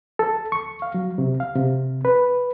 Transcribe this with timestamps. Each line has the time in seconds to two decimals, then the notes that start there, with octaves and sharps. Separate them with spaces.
0.19 A4
0.52 C#6
0.82 F5
0.94 F#3
1.18 C3
1.40 F5
1.55 C3
2.05 B4